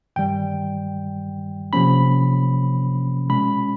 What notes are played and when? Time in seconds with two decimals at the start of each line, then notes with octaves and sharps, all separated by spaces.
0.16 G2 D#3 G3 G5
1.73 C3 F3 A#3 C#4 B5
3.29 B2 G#3 C#4 B5